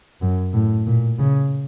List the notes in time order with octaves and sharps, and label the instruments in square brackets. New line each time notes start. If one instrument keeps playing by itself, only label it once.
[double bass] F#2
A2
A#2
C#3